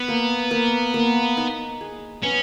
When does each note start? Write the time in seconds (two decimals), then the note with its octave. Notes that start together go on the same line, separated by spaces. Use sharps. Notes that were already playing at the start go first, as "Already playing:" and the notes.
Already playing: B3 B4
0.08 A#3
0.51 A#3
0.94 A#3
1.37 D#4
1.81 G#4
2.23 B3 C#4